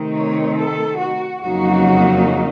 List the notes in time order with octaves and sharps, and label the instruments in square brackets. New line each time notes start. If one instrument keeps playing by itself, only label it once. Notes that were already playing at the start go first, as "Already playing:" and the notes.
Already playing: [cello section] C3 D#3 A3 C4 D#4
C#5
A4
F#4
F2 C#3 F#3 A#3 D#4 F#4